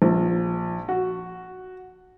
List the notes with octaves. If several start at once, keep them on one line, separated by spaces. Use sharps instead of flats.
A#1
F#4